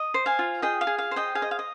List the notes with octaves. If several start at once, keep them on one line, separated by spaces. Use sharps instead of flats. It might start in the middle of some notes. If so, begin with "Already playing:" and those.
Already playing: D#5
C5
F5 G#5
F4
G#4 D#5 G5
F5
G#4
F5
C5
D#5 G5
G#4 F5
D#5
F5
D#5